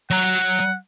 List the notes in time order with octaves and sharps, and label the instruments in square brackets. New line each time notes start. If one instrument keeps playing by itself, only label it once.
[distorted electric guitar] F#3 A#5 [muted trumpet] F#5